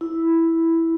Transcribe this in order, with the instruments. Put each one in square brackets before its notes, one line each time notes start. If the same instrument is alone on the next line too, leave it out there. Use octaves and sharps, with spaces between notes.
[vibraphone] E4